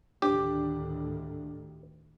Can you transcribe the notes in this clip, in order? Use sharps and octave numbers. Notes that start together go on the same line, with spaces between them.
D2 A2 D#3 D4 G4